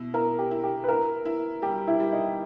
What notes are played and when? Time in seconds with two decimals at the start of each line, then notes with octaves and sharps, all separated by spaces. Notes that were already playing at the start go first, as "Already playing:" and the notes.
Already playing: B2 E4
0.14 E4 A#4
0.39 G4
0.51 E4
0.64 G4
0.84 B4
0.88 E4 A#4
1.25 E4
1.62 G3 G4
1.88 E4
2.00 G3
2.13 D#4